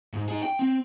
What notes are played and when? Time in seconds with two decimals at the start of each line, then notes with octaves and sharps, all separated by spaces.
0.13 G#2
0.28 D#4 G#4
0.43 G5
0.59 C4